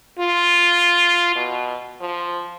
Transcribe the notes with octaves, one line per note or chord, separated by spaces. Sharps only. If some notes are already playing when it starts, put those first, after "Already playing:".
F4
B2
F3